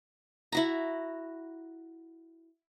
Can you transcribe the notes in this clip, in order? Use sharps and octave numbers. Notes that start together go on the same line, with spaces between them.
E4 F#4 A#5